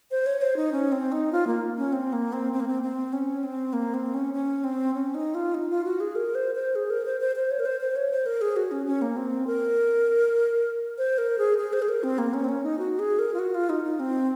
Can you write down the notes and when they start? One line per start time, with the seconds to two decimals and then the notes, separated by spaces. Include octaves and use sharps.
0.11 C5
0.26 C#5
0.42 C5
0.56 D#4
0.72 C#4
0.92 C4
1.12 D#4
1.32 F4
1.47 A#3
1.78 C#4
1.92 C4
2.13 A#3
2.33 C4
2.53 C4
2.60 A#3
2.68 C4
2.83 C4
3.13 C#4
3.43 C4
3.73 A#3
3.94 C4
4.14 C#4
4.34 C#4
4.64 C4
4.94 C#4
5.15 D#4
5.35 F4
5.54 D#4
5.70 F4
5.84 F#4
6.00 G#4
6.15 A#4
6.35 C5
6.55 C5
6.75 G#4
6.90 A#4
7.05 C5
7.21 C5
7.36 C5
7.51 C#5
7.59 A#4
7.65 C5
7.81 C5
7.96 C#5
8.11 C5
8.26 A#4
8.41 G#4
8.56 F#4
8.71 C#4
8.86 C#4
9.02 A#3
9.17 C4
9.47 A#4
10.98 C5
11.18 A#4
11.38 G#4
11.58 G#4
11.73 C5
11.82 G#4
11.89 A#4
12.03 C4
12.18 A#3
12.34 C#4
12.44 C4
12.49 C#4
12.64 D#4
12.79 F#4
12.99 G#4
13.19 A#4
13.34 F4
13.39 F#4
13.54 F4
13.69 D#4
13.84 D#4
14.00 C4